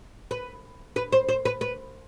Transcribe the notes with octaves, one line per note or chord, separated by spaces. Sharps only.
B4
B4
C5
C5
B4
B4